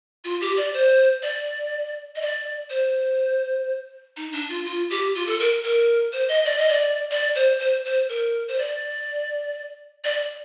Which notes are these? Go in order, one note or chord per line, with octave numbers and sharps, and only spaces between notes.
F4
G4
D5
C5
D5
D#5
D5
C5
D#4
D4
F4
F4
G4
F4
A4
A#4
A#4
C5
D#5
D5
D#5
D5
D5
C5
C5
C5
A#4
C5
D5
D5